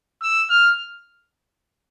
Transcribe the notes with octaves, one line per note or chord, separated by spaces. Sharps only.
E6
F6